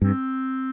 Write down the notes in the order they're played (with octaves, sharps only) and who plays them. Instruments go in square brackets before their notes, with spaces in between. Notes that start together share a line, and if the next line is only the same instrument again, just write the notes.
[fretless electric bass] G2 [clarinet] C4